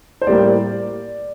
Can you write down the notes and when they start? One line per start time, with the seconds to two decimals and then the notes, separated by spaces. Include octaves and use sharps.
0.21 C5
0.27 A2 G3 A#3 D5